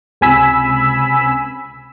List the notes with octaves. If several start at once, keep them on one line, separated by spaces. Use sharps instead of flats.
C#2 C3 G#5 B5 E6 B6